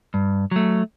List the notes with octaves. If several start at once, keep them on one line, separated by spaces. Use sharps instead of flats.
G2
F#3 A3